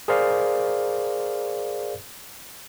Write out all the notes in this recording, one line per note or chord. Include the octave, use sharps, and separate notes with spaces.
G#4 A#4 C5 D5 F5